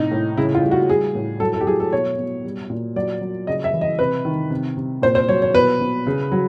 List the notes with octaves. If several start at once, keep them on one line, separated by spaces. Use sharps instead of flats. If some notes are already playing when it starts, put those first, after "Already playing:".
Already playing: A2 C3 D#4
A2
C#3 E4
F4
G3
F#4
G3 G#4
A2
F#3 A4
A4
G4
F#3 G#4
A4
B2 C#5
B2
G3
A#2
F#3 D5
F#3
C#3 D#5
E5
E3
D#5
C3 B4
D#3
C3
C3
A#2 C5
C5
F#3 C#5
C#5
B2 B4
B2
C#3
F#3